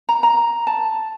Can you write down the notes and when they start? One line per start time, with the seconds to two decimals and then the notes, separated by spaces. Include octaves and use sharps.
0.09 A#5
0.23 A#5
0.67 A5